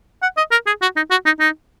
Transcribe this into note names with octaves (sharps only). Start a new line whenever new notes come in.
F#5
D#5
A#4
G#4
F#4
D#4
F#4
D#4
D#4